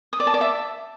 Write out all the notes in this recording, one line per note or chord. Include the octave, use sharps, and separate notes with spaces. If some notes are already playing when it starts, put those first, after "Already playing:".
D#6
D5
A5
D5
E5